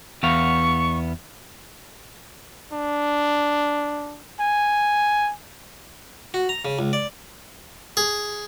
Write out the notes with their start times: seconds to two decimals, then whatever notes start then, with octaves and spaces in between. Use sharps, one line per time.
0.23 E2 B3 F5 C#6
2.73 D4
4.40 G#5
6.34 F#4
6.49 A#5
6.65 C#3
6.79 C#2
6.93 D5
7.97 G#4